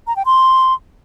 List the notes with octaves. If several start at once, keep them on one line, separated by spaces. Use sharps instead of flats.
A#5
G5
C6